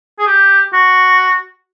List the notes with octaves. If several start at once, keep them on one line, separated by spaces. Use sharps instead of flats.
G#4
G4
F#4